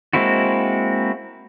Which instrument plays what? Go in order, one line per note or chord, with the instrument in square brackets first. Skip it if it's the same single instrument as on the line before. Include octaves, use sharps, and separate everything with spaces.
[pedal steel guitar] G#3 A#3 C4 E4 F#4